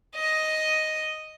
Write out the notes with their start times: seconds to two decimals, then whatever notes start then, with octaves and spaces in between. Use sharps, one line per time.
0.15 D#5